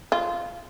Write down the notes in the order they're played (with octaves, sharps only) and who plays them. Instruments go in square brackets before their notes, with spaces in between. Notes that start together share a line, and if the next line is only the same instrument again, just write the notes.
[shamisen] F4